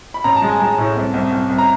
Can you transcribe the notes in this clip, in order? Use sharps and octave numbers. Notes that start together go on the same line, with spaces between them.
B5
A1 A#5
A5
G#3
G#5
G#3 A5
A2
C2
C2
C2
C2
A#5